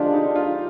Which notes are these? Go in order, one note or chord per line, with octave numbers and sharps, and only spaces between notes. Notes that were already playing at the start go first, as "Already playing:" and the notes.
Already playing: D3 F3 G#3 D4 F4 G4
D#4
F4